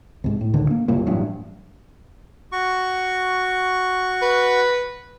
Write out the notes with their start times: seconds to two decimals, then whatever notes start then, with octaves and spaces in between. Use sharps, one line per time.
0.24 C2 G#2
0.41 A2
0.54 C#2 D3 D#3
0.71 A#3
0.88 F#1 C2 A#2
1.06 A1 G2 F#3
2.52 F#4 C#6
4.22 B4